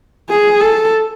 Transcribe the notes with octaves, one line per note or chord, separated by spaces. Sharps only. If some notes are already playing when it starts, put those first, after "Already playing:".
G#4
A4